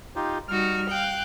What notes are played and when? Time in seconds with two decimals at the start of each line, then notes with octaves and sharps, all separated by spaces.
0.16 D#4 F4 G4
0.48 G3 D#4 F#4 F6
0.88 F5 G5 F#6